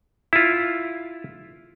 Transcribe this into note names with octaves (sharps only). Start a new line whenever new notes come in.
E4 F4